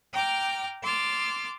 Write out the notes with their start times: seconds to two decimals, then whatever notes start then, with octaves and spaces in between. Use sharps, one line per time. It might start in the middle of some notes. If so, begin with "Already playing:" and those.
0.13 G5 A#5 D6 F6
0.83 C6 D6 E6 F6 A6